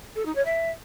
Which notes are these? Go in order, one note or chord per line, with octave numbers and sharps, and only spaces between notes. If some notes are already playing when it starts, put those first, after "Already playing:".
A4
D#4
C#5
E5